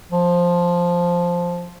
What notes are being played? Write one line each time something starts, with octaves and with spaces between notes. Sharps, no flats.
F3